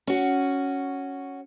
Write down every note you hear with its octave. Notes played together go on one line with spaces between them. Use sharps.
C#4 F#4